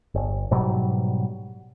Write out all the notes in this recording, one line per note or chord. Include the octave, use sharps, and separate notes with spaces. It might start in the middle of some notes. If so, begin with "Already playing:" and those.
G1
G#2 B2 F#3 G3